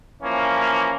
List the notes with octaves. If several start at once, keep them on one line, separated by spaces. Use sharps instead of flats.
E3 F3 A#3 C#4